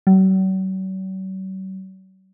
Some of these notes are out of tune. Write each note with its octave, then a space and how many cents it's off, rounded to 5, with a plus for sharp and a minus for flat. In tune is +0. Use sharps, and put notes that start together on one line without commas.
F#3 +45